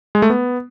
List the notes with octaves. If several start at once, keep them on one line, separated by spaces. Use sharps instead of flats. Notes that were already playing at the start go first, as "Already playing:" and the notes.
G#3
A3
B3